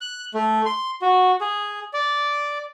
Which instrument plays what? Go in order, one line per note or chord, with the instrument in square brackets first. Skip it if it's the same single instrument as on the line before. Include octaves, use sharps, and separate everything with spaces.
[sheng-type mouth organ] F#6
A3
C6
F#4
G#4
D5